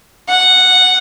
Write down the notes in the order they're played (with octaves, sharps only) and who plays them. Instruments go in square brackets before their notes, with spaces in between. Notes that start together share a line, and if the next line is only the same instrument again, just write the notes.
[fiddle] F#5